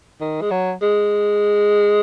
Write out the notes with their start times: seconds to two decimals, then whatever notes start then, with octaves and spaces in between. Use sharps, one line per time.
0.21 D#3
0.41 G#3
0.51 F#3
0.82 G#3